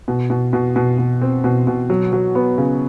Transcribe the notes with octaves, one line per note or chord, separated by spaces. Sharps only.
B2
B2
B2
B2
B2
C4
B2
B2
F#3
F#3
B3
C#3